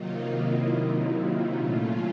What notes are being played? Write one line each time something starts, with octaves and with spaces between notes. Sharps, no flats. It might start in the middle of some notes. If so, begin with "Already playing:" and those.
Already playing: C3 D#3 F#3 A#3 D#4 F4
E4
D#4
E4
A#2 F#3 A3 C#4 F4